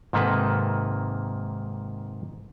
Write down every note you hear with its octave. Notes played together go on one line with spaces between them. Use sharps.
G#2 C3 D#3 A#3 A4 B4